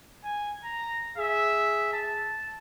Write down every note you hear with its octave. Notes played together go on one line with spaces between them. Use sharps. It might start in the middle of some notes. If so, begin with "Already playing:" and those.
G#5
A#5
G#4 E5
A5